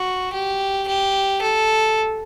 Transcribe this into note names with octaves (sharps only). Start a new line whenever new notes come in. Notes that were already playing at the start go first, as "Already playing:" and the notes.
Already playing: F#4
G4
G4
A4